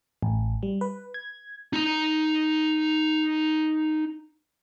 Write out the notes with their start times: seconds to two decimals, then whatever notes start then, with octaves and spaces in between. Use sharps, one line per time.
0.23 A1
0.63 G3
0.81 B4
1.14 G#6
1.73 D#4 A#5